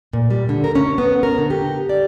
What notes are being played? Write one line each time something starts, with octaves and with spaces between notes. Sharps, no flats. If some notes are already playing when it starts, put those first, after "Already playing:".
A#2
G3
D3
A#4
C#4
B3
A#4
D3
G4
D5